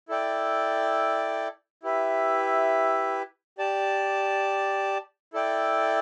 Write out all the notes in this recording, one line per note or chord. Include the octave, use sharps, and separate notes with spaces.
E4 A4 D5 G5
E4 G4 B4 E5
G4 D5 A5
E4 A4 D5 G5